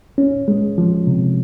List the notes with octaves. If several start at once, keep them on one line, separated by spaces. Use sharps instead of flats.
C#4
G#3
F3
C3